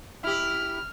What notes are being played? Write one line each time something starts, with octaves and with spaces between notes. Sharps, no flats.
E4 G4 F6